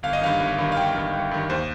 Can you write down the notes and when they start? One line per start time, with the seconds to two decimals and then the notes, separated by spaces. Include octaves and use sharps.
0.03 G1 F5
0.13 D#5
0.21 G2 D#3 F5
0.40 G1
0.58 G2 D#3
0.72 F5
0.77 G1 G5
0.95 G2 D#3
1.13 G1
1.31 G2 D#3
1.50 D#2 C5